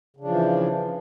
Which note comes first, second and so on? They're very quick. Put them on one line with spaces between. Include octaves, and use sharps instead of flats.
C#3 D4 F3 E3